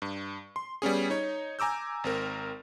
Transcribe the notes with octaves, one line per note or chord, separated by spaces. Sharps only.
G2
C6
G3 B3 C#4 G#4
D#4 C#5
G#5 A#5 D6 E6 G6
G#1 C4 A#4